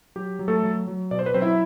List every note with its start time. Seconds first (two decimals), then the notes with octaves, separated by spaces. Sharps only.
0.16 F#3 G4
0.39 F#3
0.48 A3 A4
0.63 F#3
0.87 F#3
1.11 B2 D5
1.19 C5
1.26 B4
1.34 F#3 C4 C5
1.42 E4 E5